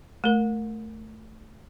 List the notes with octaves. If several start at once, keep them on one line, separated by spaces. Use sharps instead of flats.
A3 A#4